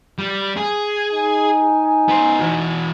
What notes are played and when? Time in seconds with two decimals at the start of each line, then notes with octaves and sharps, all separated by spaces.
0.18 G3
0.57 G#4
1.11 D#4 G#5
2.08 B3 C5
2.39 E3 F#4